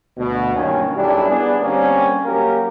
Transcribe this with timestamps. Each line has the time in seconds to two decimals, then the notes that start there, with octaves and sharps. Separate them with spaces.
0.17 D2 B2
0.55 G2 D#3 F#3 A#3 C#4
0.95 B1 F#2 G3 D4 E4 G4
1.29 B3 D4 G#4
1.62 D3 G3 A#3 C4 C#4
2.23 F#3 A#3 C#4 G4 A#4